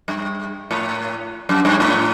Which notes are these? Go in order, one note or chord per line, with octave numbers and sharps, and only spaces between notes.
G2
A2
F#2
G2
A2